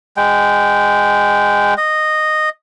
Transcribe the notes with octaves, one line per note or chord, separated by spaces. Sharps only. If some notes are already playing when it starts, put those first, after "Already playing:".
G#3 G5
D#5